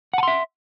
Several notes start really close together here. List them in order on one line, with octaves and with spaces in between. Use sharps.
F#5 A5 C6 E5